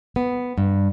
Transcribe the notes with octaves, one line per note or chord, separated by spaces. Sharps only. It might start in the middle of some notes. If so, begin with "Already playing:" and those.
B3
G2